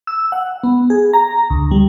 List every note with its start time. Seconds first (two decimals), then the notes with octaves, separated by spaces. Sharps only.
0.07 E6
0.32 F#5
0.63 B3
0.90 G#4
1.13 A#5
1.50 D2
1.71 G3